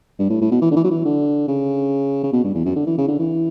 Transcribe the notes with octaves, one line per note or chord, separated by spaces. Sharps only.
G2
A2
A2
B2
E3
D3
E3
F#3
E3
D3
C#3
C#3
B2
G2
E2
F#2
D3
E3
C#3
D3
E3